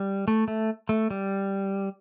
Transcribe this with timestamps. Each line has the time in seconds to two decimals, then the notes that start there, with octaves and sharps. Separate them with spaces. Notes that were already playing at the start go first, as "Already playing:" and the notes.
Already playing: G3
0.28 A3
0.48 A3
0.89 A3
1.11 G3